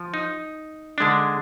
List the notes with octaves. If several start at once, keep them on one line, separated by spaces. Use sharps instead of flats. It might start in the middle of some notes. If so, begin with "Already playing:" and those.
Already playing: F3
D#4
D3 G#3 D4